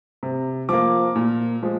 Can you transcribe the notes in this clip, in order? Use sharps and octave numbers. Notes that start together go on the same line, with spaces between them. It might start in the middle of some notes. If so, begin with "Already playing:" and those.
C3
F3 A#3 D6
A#2
F3 G#3